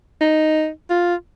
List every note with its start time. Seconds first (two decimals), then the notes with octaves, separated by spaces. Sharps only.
0.21 D#4
0.90 F4